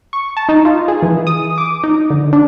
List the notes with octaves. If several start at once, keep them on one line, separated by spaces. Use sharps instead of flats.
C#6
A5
D#4
F4
G#4
E3
D#6
D6
D#4
D3
D4